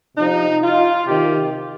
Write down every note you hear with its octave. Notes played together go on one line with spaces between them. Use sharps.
C3 F3 D#4
F4
C3 D#3 G4